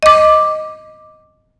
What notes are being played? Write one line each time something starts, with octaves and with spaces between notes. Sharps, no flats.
D#5 D6